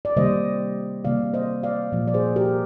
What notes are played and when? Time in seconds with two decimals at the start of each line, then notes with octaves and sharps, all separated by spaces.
0.05 D5
0.16 C3 D#3 G3 A#3 C5 D#5
1.04 C3 D#3 G3 A#3 D5 F5
1.34 C5 D#5
1.63 D5 F5
1.92 A#2 F3 A#3
2.07 D5
2.14 G#4 C5
2.36 G4 A#4